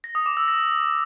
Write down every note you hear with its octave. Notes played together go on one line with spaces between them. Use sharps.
A#6
D#6
D6
E6
A#6